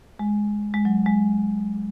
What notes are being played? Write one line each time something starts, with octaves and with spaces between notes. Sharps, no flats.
G#3
G#3
F#3
G#3